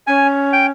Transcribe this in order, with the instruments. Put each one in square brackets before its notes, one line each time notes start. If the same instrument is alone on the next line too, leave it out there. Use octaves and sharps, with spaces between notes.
[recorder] C#4 [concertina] G#5
[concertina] G5